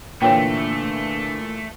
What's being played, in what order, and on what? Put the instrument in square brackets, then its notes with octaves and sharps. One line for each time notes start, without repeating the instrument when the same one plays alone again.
[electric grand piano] A#2 E3 [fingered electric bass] D3 [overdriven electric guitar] A3 [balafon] C#5 G5